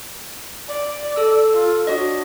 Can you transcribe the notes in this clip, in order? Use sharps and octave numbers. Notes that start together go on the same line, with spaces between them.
D5
A4 E6
F4
D4 F#4 C#5 D#5